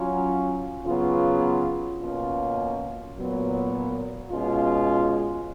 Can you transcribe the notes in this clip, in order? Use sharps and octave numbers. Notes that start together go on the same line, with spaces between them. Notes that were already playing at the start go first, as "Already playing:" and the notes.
Already playing: F#3 C#4 F4
C#3 F#3 B3 F4
B2 A#3 C#4 F4
A#2 F#3 B3
B2 G#3 C#4 F4